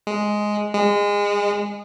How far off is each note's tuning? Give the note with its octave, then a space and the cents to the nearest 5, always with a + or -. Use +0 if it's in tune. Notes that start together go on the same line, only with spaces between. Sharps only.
G#3 +5
G#3 -25